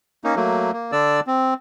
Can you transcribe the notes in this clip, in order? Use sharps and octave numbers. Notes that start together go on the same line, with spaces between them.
A#3 C#4 D#4
F#3 A3 A#3
A#3
D3 D4 D5 E6
C4